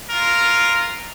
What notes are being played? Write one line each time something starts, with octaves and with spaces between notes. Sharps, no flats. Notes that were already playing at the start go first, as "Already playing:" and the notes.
F4 A#4